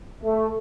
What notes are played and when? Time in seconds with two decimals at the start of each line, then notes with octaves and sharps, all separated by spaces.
0.24 A3